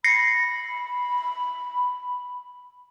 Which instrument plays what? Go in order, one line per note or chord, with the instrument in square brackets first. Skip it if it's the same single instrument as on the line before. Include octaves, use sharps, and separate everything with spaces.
[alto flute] B5 [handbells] A#6 C7 C#7